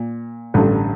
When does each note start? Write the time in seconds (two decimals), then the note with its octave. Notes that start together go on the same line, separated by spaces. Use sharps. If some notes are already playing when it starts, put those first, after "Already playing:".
Already playing: A#2
0.54 A1 G2 D3